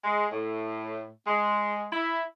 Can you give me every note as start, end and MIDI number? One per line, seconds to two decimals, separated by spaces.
0.03 0.27 56
0.32 1.07 45
1.26 1.86 56
1.92 2.22 64